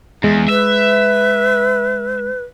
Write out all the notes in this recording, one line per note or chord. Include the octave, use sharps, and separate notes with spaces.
E2 G#3
B4 E5